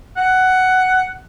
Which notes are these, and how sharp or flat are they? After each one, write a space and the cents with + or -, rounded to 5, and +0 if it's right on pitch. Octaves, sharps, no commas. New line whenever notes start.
F#5 +10